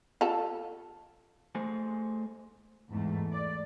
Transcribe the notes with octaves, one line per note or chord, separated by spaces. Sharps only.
F4 A4
A3 G#4 C5 G#5
E2 G#2 A3
D5